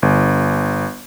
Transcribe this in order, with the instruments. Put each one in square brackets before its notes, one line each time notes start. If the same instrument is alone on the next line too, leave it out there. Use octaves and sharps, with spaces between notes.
[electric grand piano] G1